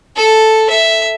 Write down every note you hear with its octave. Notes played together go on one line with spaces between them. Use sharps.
A4
E5